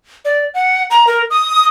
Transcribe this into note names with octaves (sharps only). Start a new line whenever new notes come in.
D5
F#5
A#5
A#4
D#6